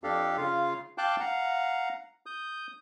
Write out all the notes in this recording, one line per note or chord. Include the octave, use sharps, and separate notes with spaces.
F2 D4 G4 A4 F5
C#3 F4 F5
F5 G5 A5 D6 F#6 G6
F5 F#5 A#5
D#6 G6